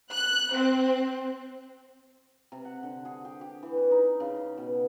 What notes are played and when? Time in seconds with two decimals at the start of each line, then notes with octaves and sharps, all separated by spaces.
0.13 F#6
0.56 C4
2.52 C3
2.65 F#5
2.83 D3
3.05 G#4
3.25 G4
3.41 G4
3.63 E3
3.77 B4
3.91 D#4
4.20 C#3
4.36 D#5
4.57 B2